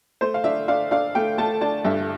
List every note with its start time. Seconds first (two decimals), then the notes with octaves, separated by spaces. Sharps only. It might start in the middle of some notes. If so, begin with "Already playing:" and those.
0.21 A3 C5
0.34 F5
0.44 D4 E5
0.68 D4 F5
0.91 D4 F5
1.15 A3 G5
1.38 A3 A5
1.61 D4 A5
1.85 G2 E5